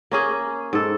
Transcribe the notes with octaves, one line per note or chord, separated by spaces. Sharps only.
A#3 C#4 G#4
G#2 A4